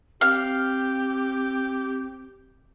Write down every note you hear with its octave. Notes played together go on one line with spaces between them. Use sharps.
C4 G4 F5